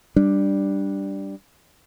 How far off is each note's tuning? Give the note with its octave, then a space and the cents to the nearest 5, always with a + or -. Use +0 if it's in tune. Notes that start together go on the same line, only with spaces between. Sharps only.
G3 +0 D4 +0